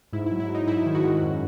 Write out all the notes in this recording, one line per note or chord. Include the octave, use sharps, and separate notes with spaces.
G#2 E4
E4
F#3
E4
F#3
D#4
G#2 E4
D#3
D#4 F#4
G#2
F#2